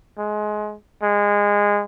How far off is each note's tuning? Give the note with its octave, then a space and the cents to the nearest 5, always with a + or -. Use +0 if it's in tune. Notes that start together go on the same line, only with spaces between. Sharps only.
G#3 +25
G#3 -20